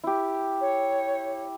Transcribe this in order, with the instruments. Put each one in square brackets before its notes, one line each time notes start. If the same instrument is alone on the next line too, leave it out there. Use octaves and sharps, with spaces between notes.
[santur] E4 G4
[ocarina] C#5